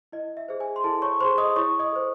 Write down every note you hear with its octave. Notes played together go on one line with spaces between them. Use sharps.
E4 D#5
E5
G#4 C5
G#4 G#5
C6
E4 A4 A5
C#5 C#6
C5 C6
G#4
D#5 D#6
E4 C#5 C#6
D#5 D#6
A4 C5